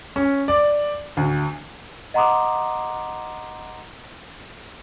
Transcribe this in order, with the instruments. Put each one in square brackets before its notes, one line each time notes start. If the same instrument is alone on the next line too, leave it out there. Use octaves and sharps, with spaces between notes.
[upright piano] C#4
D5
D2
[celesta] D#5 F#5 A#5 C6 D6 D#6